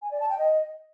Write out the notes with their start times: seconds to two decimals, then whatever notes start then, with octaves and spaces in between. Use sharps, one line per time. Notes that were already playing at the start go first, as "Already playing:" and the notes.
0.02 G#5
0.11 D5
0.20 A5
0.29 G5
0.39 D#5